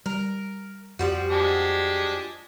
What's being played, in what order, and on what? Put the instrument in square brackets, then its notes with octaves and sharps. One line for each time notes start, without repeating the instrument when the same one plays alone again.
[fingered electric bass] G3 [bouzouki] A#4
[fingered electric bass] F2 [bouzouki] F3 G3 F#4
[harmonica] G#3 D4 G4